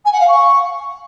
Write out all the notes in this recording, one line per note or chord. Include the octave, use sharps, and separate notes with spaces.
G#5
F#5
F5
C#6